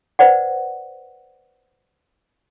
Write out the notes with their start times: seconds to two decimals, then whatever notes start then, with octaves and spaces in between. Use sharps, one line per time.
0.19 B4 C5 D5 F#5